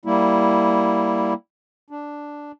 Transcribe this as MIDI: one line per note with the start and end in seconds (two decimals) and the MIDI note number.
0.05 1.33 55
0.05 1.33 58
0.05 1.33 64
1.90 2.52 62